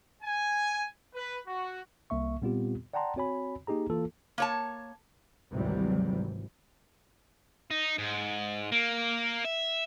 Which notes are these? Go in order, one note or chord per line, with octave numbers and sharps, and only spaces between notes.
G#5
B4
F#4
C2 A#3 E5 C#6
A#2 G3 B3 C4 F4 G4
D5 F#5 G5 A5 A#5 C6
C4 F#4 C#5 G#5 B5
A#3 D#4 G4 G#4 A#5
E3 A#3 F4 A4
A#3 C#5 A5
G#1 D2 C3 E3 F#3 G3
D#4
G#2
A#3
E5